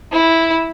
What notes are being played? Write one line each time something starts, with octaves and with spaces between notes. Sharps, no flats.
E4